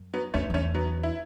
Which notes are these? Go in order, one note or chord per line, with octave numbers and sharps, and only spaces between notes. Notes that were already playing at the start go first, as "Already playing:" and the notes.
Already playing: F#2
F#3 B3
E2 A3 C#4
E2 A3 C#4
F#3 B3
E4